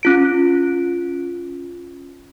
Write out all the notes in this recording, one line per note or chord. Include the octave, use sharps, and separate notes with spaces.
C#4 F4 D7